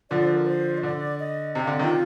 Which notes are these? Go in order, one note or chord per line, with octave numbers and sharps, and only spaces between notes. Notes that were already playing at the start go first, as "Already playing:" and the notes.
D3 F3 D5
C5
A#4
C5
D#5
D3 D5
D#5
C3 D#5
D3 F5
D#5
C3 D#3 F4